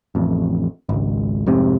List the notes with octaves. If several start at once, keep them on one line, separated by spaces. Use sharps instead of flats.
A1 F2
G#1 C#2
F1 G#2 C3 C4